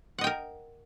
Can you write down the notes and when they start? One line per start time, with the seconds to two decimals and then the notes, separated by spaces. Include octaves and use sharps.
0.18 F#5
0.21 D#5
0.24 G5
0.27 A#4